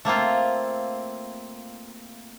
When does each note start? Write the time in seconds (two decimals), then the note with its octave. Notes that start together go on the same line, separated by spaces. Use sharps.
0.05 A3 A#3 C4 F4